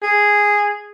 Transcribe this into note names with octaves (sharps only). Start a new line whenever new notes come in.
G#4